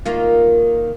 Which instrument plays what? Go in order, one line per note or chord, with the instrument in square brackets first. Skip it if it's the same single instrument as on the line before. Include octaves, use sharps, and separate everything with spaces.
[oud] D#3 A#3 F4